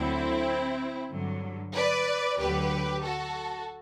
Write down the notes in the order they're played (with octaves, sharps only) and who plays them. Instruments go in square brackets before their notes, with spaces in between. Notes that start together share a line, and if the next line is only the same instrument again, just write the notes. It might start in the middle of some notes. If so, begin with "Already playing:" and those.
Already playing: [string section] D2 D3 F#3 C4 E4
G2 D3 F#3
B4 D5
D2 D3 F#3 G4 B4
F#4 A4